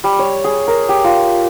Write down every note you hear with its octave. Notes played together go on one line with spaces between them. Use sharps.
G3
C#5
G#4
A#4
G4
F4